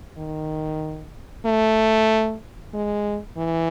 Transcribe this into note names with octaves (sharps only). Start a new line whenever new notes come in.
D#3
A3
G#3
E3